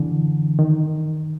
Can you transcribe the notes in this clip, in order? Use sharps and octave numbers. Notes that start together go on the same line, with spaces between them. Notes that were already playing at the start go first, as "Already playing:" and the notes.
Already playing: D3 E3
D#3